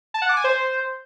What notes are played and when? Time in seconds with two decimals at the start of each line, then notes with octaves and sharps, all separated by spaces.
0.14 A5
0.22 F#5
0.29 D6
0.37 G#5
0.44 C5